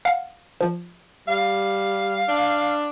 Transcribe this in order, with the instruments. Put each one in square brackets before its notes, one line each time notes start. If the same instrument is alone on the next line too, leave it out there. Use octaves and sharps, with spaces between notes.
[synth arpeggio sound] F5 F#5
F3
[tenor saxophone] G3 [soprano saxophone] F5
[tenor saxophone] D4